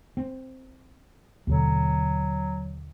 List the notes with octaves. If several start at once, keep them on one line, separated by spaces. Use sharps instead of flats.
C4
D#2 B2 D3 F#3